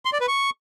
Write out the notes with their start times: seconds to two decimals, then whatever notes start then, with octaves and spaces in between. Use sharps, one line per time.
0.05 C6
0.13 D5
0.20 B4
0.28 C#6